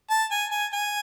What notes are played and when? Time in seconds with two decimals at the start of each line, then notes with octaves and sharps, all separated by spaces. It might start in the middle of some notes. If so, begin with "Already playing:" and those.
0.10 A5
0.31 G#5
0.51 G#5
0.72 G#5